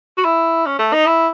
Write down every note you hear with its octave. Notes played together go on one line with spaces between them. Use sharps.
F#4
E4
C#4
A3
D#4
E4